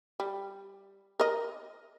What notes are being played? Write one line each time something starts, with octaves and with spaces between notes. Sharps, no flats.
G3
A#4 D#5